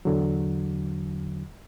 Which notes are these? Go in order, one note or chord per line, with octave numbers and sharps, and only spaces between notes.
E2 D3 F#3